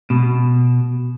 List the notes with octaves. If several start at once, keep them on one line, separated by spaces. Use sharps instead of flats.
B2